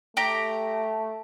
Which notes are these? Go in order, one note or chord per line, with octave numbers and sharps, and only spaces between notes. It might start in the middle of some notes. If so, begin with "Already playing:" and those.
A3 G4 A#5